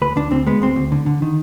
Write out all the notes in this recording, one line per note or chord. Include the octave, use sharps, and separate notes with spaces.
D2 B4
D2 D4
D2 C4
G#3 B3
D2 C4
D2
D3
D3
D#3